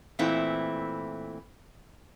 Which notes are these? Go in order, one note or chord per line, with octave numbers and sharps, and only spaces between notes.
A#2 E3 A3 C4 E4